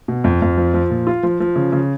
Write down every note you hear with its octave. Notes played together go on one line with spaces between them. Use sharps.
B2
F2
F2
F3
F3
A#2
F4
F3
F3
C#3
C#3